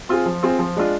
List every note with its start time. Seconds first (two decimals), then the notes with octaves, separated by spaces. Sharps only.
0.09 C4 F4 G#4
0.26 F3
0.43 C4 F4 G#4
0.59 F3
0.77 G#3 D4 F4